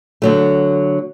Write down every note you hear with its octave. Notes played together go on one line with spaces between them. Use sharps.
D3 F#3 A3